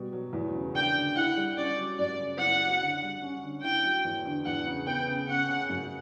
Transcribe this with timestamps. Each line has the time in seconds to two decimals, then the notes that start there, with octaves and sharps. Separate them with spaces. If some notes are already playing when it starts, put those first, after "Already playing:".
Already playing: B2 G3
0.12 F#3
0.33 E2
0.54 C#3
0.75 D4 G5
0.95 D3
1.16 E4 F#5
1.37 G3
1.57 C#4 D5
1.77 F#3
1.98 F#2 D5
2.19 C#3
2.39 E4 F#5
2.60 F#3
2.81 D3
3.02 G3
3.22 C#4
3.43 D3
3.63 E4 G5
3.84 F#3
4.05 E2
4.25 D3
4.46 E2 F#5
4.66 C#3
4.87 B3 G5
5.08 C#3
5.28 C#4 F#5
5.49 C#3
5.69 F#2